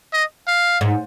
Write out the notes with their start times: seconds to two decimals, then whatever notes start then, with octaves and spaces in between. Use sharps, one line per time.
0.14 D#5
0.48 F5
0.81 G#2